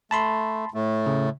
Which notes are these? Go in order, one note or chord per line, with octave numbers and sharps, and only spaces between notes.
A3 A5 B5 C6
A2 A3
C#3